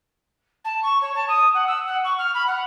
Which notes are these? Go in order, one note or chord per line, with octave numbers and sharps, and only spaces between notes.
A5
C#6
C#5
A5
D#6
F#5
E6
F#5
C#6
F6
B5
F#5